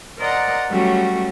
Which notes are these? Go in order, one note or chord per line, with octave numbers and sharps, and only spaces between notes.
A#4 C5 D5 D#5 F#5 A#5
F#3 G3 A3 C#4 F#4